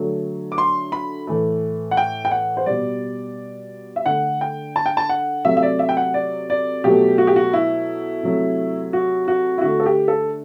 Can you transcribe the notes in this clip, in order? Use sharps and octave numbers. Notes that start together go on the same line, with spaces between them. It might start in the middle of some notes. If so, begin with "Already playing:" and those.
Already playing: D3 F#3 A3
D6
C6
B5
A2 E3 A3
F#5
G5
G5
F#5
C5
B2 G3 D5
E5
D3 A3 F#5
G5
A5
G5
A5
F#5
C3 F#3 A3 E5
E5
D5
E5
G5
F#5
D5
D5
B2 F#3 A3 G4
F#4
G4
F#4
E4
C3 F#3 A3
F#4
F#4
E4
D3 A3 F#4
A4
G4
A4